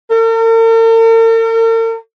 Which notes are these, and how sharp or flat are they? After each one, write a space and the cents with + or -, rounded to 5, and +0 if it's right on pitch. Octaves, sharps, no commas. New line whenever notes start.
A#4 -45